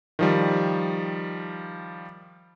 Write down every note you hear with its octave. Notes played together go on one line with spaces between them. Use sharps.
D#3 F3 G3